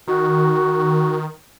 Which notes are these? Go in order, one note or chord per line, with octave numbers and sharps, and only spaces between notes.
D#3 F#4